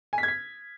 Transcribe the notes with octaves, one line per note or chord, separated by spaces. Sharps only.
G#5
B6
G#6
B6